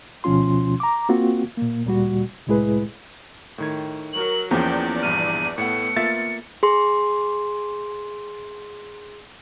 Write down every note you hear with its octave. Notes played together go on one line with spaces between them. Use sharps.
D2 B2 F3 C#4 F4 C6
A#5 D6
A#3 C4 F4 F#4
A#2 A#3
D2 A#2 G3 F#4
C2 A2 G#3 E4 G#4 B4
A2 D#3 G#6
F#3 A#4 F#7
E2 F3 A#3 C#4 D5 G5
A#1 G2 F6 D#7
A2 A3 B3 F#5 C#7
A#3 F4 E5 A6
G#4 C6